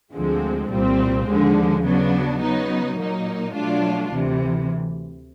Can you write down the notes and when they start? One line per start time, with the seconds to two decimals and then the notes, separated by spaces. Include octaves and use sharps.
0.15 D2 D3 F3 G#3 C4
0.71 C2 A#2 G3 C4
1.28 D#2 D3 F3 G#3
1.85 C#3 F#3 B3 D4
2.41 C#3 F#3 B3 D#4
2.98 A#2 F#3 A#3 D#4
3.55 B2 F#3 A3 D4 F4
4.11 D2 C3 E3